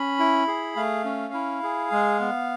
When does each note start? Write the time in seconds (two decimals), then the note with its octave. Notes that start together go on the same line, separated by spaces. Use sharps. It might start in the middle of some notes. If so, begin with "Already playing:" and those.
Already playing: C#4 B5
0.19 E4
0.48 G#4
0.76 A3 F5
1.05 C#4
1.34 E4
1.63 G#4
1.92 G#3
2.20 B3